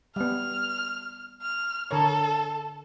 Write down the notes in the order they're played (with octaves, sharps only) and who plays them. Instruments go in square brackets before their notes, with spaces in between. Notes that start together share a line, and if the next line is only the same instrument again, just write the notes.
[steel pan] G3 B3 [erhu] F6
[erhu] F6
[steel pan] D3 A#4 C#5 [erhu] A4